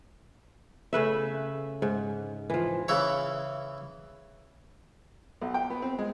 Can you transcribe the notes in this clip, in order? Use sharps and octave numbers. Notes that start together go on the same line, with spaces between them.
C#3 A3 B4 E5
G#2
E3 F3
C#3 E3 E4 C#5
B1
G5
B3
C4
G#3